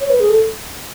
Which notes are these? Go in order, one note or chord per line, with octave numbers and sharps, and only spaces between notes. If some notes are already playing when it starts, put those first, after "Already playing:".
C#5
B4
G#4
A4